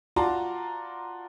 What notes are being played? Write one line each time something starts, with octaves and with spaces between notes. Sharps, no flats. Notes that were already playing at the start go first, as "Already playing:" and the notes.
F4 F#4 D5 A5 A#5 C6